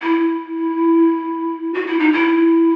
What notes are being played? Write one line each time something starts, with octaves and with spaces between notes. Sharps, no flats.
E4
F#4
E4
D#4
E4